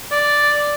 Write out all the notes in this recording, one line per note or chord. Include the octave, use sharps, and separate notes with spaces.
D5